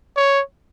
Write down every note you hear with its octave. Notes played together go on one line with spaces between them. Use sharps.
C#5